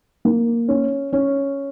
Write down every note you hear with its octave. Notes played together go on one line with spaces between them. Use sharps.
A#3
C#4
C#4